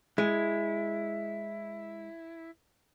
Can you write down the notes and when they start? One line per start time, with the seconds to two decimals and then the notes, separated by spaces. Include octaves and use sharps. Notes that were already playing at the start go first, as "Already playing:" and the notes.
0.18 G#3 E4